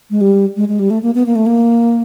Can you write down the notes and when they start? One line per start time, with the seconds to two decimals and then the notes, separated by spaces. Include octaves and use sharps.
0.11 G#3
0.21 G3
0.57 G#3
0.68 G#3
0.79 G3
0.90 A3
1.03 A#3
1.15 B3
1.26 A#3
1.36 A3
1.46 A#3